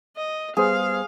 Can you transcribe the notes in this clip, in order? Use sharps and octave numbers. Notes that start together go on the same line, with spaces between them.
D#5
G3 B3 G#4 C5 F5